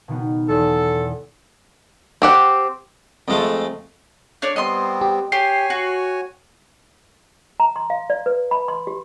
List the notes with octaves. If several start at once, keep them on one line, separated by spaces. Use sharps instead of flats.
B2 D#3 B3
E2 A4
C4 G4 F#5
F2 G#3 A3
D4 C#5 D5
G3 B3 C4 D#5 C6
G4
G4 C#5 G#5 C7
F#4
A#5
C6
F5
D5
B4
B5
C6
G4